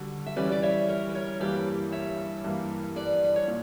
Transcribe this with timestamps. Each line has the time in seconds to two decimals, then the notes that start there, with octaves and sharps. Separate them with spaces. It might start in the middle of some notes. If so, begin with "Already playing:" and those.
Already playing: D3 G3 F#4
0.26 E5
0.36 E3 G3 C#4 B4 D5
0.52 D5
0.62 C#5 E5
0.88 A#4 C#5
1.09 B4
1.14 A#4 C#5
1.40 G2 E3 G3 A#3 G4 B4
1.92 C#5 E5
2.44 G2 E3 A#3
2.96 B4 D5
3.24 B4
3.36 C#5
3.48 A#2